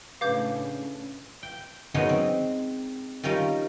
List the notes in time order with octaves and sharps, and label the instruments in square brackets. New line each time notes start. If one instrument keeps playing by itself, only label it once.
[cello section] A2 C#3 D4 [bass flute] C#4 [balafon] B4 [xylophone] F5 D6 G6
[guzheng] G5
D#3 F#3 G#3 B3 C#4 D#4
C4
D#3 G3 C#4 F4 A#4